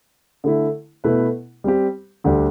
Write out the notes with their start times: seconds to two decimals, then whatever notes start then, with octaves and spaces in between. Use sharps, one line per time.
0.44 D3 A3 E4
1.04 B2 A3 E4 B4
1.64 G3 C4 G4
2.24 D2 D3 G3 D4 G4